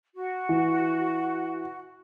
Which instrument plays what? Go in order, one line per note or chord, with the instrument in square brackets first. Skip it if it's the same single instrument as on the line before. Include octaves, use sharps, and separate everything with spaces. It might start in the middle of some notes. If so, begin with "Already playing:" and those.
[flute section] F#4
[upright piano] E3